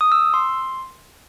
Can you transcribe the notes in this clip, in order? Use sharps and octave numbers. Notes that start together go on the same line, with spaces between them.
D#6
E6
E6
C6